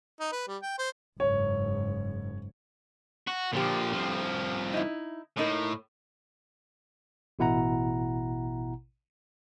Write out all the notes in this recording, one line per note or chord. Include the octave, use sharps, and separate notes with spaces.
D#4
B4
G3
G5
C5
F#1 G#2 C#5
F#4
A#2 D3 F3 G4
C2 F3
D#4 E4
A2 A#3 D#4 A#4
A1 B2 E4 F#5 A#5